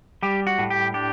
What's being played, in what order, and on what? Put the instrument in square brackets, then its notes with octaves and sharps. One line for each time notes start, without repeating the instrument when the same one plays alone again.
[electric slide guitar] G3 G4
F#4
A2
G4
D4 G4